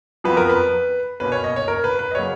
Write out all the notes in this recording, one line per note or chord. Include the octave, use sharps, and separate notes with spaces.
F2 F3 B3 B4
A#4
B4
B2 A#3 C#4 B4
C#5
D#5
C#5
A#4
B4
B4
D#5
C#3 F#3 A#3 C#5